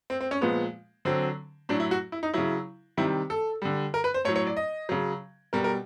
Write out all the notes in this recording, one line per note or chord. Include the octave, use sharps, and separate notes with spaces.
C4
C4
C#4
A#2 F3 G#3 B3
D3 F#3 C4
A2 F#3 D4
E4
F#4
E4
D#4
C#3 F#3 E4
C3 D#3 G3 E4
A4
D3 G3
A#4
B4
C5
A2 F#3 C#5
C#5
D5
D#5
C#3 F#3
B2 G3 A#4
A#4